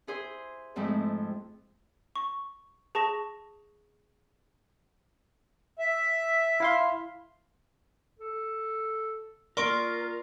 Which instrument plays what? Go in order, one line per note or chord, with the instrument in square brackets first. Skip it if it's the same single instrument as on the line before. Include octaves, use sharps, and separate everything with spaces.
[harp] E4 G#4 C5
F2 G#2 G#3 A3 C4 E4
[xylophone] C#6
G#4 A5 C#6 A#6
[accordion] E5
[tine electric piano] E4 F5 C6
[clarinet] A4
[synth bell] A#3 D5 [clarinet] F4 [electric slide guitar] A#4 [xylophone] C6 C#6 D7